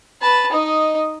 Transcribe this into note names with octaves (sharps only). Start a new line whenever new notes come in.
B4 A5
D#4 D#5